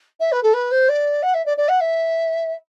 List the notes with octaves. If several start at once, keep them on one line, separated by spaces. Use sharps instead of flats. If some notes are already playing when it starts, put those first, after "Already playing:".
E5
B4
A4
B4
C5
D5
F#5
E5
D5
D5
F#5
E5